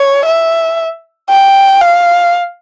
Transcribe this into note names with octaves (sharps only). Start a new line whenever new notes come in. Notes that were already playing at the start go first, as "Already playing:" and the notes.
Already playing: C#5
E5
G5
F5